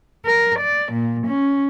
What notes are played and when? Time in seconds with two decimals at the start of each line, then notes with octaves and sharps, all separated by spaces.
0.24 A#4
0.58 D5
0.91 A#2
1.26 C#4